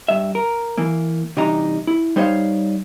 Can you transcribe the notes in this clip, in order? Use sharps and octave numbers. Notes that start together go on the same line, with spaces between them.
G2 E5
A#4
E3 A#3
C3 E3 G3 D4 D#4 A#5
E4
G3 D#4 C5 C#5 F5